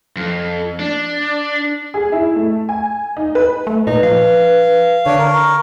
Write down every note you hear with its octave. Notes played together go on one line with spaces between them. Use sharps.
F2
D4
G#4
E4
A3
G#5
D#4
B4
A3
A#2 D#4 B4
F3 F5
D3 D4 C#5 C#6
A#4